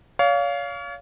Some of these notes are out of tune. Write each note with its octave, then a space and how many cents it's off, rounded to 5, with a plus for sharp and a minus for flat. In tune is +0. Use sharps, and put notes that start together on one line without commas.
C#5 +40 F5 +0